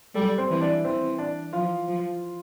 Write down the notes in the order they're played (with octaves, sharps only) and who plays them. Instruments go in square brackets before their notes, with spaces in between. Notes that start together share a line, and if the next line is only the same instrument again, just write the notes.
[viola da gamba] G3 [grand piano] A4
[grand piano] C4 C5
[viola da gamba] E3
[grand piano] D4 D5
[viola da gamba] E3 [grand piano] C4 C5
[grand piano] D4 D5
[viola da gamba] F3 [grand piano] F4 F5
[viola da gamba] F3